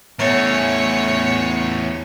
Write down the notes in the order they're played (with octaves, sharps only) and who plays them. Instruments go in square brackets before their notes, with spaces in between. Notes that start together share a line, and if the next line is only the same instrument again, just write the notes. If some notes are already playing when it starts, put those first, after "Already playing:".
[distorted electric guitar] E2 A3 [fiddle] C#5